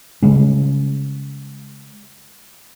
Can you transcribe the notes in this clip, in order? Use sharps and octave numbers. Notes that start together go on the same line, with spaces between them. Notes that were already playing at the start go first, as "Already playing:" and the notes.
C#3 G3 G#3 C#4